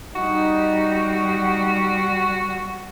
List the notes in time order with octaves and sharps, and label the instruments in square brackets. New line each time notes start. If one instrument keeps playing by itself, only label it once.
[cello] G3 [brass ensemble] D#4 [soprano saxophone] F#4